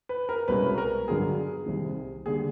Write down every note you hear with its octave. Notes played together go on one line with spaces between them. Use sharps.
B4
A#4
C2 B2 G#3 C#4 B4
A#4
G2 D3 F#3 B3 G#4
C2 C3 D#3
D3 G3 A#3 G#4